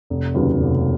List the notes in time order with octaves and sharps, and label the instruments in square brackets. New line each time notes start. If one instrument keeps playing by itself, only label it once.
[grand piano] F1
D#2 C#3 F#3 B3
F1